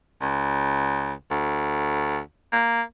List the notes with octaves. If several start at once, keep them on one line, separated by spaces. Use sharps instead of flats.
C#2
D2
A#3